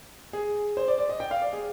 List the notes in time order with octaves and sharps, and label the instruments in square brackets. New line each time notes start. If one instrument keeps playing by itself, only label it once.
[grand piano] G#4
C5
D5
D5
D#5
G5
F5
D5
G#4